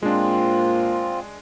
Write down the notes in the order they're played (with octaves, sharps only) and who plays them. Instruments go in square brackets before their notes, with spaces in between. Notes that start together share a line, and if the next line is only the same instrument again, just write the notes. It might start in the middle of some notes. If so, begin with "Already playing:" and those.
[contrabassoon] A#2 [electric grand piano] G#3 D4 [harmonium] C4 F4